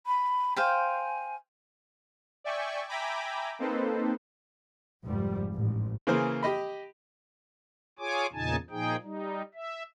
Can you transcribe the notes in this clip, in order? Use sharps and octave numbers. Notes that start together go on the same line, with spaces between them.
B5
C5 F5 G5 G#5
D5 E5 G5 G#5 C#6
E5 G5 G#5 A#5 B5 D6
A#3 C4 D#4 A4 B4 C5
F1 G#2 F3 G3
A1 G#2
C#3 E3 A#3 G#4 C5
G4 D#5 B5
F4 G#4 C#5 G#5 D6
E2 A#2 C#3 D#4 G#5 A5
A#2 F3 D#4 G#4 G5
G3 D#4
E5